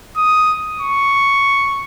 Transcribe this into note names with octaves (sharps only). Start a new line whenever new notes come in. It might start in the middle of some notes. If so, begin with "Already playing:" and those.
D#6
C#6